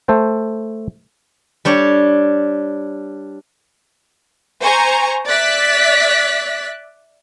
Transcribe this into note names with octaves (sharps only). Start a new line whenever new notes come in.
A3 A4 C5 G5
G3 D4 C#5
C5 G#5 A#5 C#6
D5 E5 F#6 A6 B6